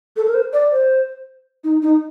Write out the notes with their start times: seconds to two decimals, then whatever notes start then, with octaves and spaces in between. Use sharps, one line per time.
0.16 A4
0.27 A#4
0.34 C5
0.53 D5
0.71 C5
1.64 D#4
1.82 D#4